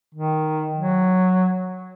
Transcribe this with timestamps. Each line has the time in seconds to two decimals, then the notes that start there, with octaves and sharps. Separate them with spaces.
0.15 D#3
0.76 F#3